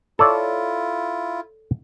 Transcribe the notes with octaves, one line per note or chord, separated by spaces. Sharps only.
E4 F4 A4 C#5 D5